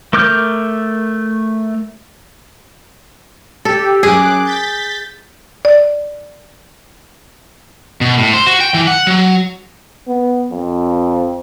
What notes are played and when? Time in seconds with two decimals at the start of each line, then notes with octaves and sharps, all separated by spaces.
0.13 A3 A#4 D6 F6 G6
3.65 G4 A4
4.03 F#2 G#4 D6 F#6
4.44 G6 A6 B6
5.65 D5
8.01 B2
8.18 A2
8.34 C5
8.47 F#4
8.61 G5
8.74 E3
8.87 F#5
9.07 F#3
10.08 B3
10.51 F2